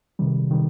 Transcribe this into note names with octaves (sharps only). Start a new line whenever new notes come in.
C3 D#3 G3
C3 D#3 G3